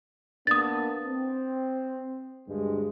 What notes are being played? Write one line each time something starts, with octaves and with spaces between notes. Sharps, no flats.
A#3 B3 D4 D#6 A6
C4
D2 G2 G#3